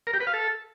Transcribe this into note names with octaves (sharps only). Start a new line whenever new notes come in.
A#4
G4
B4
F5
A4